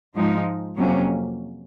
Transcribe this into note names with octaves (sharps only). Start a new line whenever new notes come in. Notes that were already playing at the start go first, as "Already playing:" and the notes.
G#2 F3 G#3 D#4
F2 C3 F#3 A#3 C#4